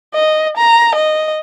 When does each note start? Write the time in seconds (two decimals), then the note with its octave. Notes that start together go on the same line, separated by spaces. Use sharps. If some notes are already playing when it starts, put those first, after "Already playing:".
0.14 D#5
0.57 A#5
0.95 D#5